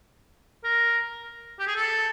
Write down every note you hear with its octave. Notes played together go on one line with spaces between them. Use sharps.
A#4
G4
G#4
A4